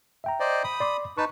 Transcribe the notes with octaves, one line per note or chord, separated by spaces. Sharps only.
E5 G5 A#5
C5 D5 D#5
B5 D#6
D5 C6 D6
D#4 B4 A5 C#6